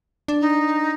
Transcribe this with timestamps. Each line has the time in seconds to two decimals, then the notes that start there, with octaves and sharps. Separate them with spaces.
0.28 D4
0.40 D#4